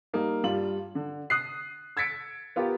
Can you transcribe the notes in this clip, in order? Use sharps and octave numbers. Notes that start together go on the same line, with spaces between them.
G3 A#3 D#4
G2 G3 F4 F#7
D3
D#6 F#6 C7
E6 G#6 A6 B6 C#7 D7
B3 F4 G4 A#4